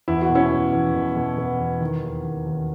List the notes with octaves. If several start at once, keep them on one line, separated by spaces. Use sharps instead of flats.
E2 E4
F#4
B2
C#4 E4
B2
E2
B2
B2
B2
E2
D#3
D#2
D#2
D#2